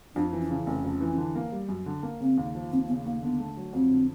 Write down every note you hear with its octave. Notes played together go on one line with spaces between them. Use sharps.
F2 D4
E3
C#4
C#3
F1 C#4
F2
E3
D3
A#3
G3
F#2
D3
A#3
C#3 C4
D#2
F3
D#2 C4
C#3 B3
D#2 A#3
D3 B3
A3
F#3
F2 C4
D3